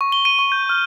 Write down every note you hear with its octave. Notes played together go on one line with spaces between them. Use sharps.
C#6
G7
D#7
C#6
G6
F6